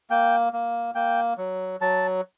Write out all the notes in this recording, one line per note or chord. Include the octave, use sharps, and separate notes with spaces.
A#3 G5
A#3
A#3 G5
F#3
F#3 A5